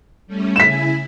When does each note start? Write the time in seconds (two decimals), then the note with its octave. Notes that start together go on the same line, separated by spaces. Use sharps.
0.27 G3 A3 C#4
0.56 C#3 E4 G#5 B6 E7